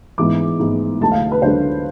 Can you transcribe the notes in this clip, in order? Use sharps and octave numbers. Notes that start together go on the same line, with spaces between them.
G#2 E3 G#3 B3 D6
G#2 E3 G#3 B3
D2 D3 F#3 A3 A5
F5
B4
D2 D3 F#3 A3 C5